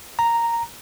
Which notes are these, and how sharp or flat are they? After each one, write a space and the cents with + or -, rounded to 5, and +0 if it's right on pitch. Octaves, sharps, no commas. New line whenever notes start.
A#5 -5